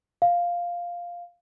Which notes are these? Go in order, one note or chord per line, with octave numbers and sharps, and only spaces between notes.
F5